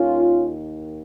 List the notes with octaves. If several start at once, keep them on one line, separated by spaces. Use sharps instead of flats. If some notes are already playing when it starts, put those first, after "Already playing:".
Already playing: D#2 D#3 C#4 F4